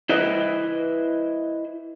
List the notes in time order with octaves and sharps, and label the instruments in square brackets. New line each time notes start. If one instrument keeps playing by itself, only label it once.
[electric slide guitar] E4 B4 C5 D#5